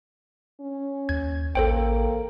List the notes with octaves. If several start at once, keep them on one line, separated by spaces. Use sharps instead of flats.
C#4
D#2 G#6
A1 A#3 A4 C5 G5